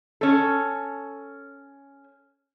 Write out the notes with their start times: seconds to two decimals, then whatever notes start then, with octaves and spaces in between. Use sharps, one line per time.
0.21 C#4 A4